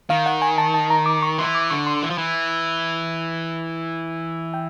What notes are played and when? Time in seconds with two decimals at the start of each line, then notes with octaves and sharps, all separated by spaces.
0.10 D#3 F5
0.26 F#5
0.42 G#5
0.58 A5
0.74 A5
0.90 A#5
1.06 D6
1.22 C#6
1.38 E3 C6
1.55 D6
1.70 D3 C#6
1.87 C6
2.02 E3
2.10 F3
2.18 E3
4.54 G5